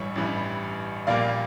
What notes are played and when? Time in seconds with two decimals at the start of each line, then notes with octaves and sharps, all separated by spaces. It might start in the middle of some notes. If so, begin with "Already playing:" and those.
Already playing: A1 G2 E3 G3 C#5 E5
0.16 A1 G2 E3 G3
1.07 A#1 A#2 G3 A#3 D5 F5